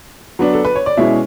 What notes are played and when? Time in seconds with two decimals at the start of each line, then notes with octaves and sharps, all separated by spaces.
0.39 F#3 B3 D4
0.53 A4
0.65 B4
0.75 C#5
0.86 D5
0.97 B2 G#3 C#4 E4 E5